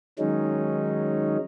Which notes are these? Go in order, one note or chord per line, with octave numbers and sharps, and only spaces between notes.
D#3 F#3 G#3 C#4 D#4